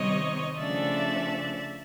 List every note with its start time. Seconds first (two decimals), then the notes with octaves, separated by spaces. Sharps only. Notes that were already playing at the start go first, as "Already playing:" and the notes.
Already playing: C3 D#3 G3 C4 C#5 D#5
0.57 C#3 F3 A3 D4 D5 E5